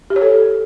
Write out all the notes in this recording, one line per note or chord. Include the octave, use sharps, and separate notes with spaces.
G4
C#5
A4